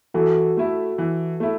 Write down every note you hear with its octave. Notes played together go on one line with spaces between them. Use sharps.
E3 F#4 A4
A3 E4
E3
A3 E4